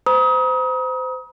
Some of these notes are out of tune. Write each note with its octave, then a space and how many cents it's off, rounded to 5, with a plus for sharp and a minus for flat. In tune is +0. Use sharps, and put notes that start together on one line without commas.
C5 -30 A#5 +45 D#6 +30